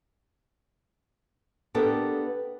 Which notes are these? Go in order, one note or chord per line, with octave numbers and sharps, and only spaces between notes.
B3 D4 G4 A4 A#4